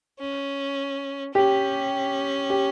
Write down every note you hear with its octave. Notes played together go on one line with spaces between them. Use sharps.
C#4
C#4 G4
G4